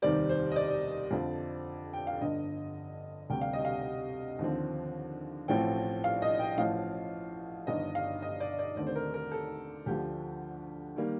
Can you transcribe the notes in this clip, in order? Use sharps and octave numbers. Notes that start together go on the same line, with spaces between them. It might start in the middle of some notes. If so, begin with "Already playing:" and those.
F1 D#2 D#3 G3 C4 D5
C5
D#5
D5
F2 D3 F3 C4
G5
F5
G1 G2 D3 D#5
D2 C3 G3 G5
F5
D#5
F5
D#2 D3 F3 C4
A1 A2 F3 A3 C4 G5
F5
D#5
G5
A1 A2 F3 F5
G1 G2 D#3 D#5
F5
D#5
D5
D5
D#2 D3 A3 C4 D5
C5
A#4
A#4
A4
D2 D3 F3 G4
D#3 G3 A#3